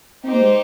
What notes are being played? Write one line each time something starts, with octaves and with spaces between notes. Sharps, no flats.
C4 D#4 G4 C5
A#3
G#3